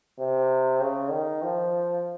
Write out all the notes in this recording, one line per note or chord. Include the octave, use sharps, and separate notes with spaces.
C3
C#3
D#3
F3